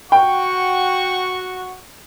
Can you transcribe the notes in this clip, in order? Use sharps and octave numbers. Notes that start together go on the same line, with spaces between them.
F#4 F#5 G5 C#6